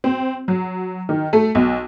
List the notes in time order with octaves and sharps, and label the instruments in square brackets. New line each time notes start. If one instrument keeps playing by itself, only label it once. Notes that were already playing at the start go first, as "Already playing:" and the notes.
[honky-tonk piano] C4
F#3
D#3
A3
B1